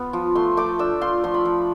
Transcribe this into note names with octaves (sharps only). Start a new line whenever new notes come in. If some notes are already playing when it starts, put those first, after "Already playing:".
Already playing: B3 F4
F3
A3 C6
A3 D6
D4 E6
F4 C6
F3 C6
B5
F3